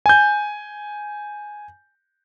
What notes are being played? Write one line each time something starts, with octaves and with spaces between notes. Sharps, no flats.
G#5 G6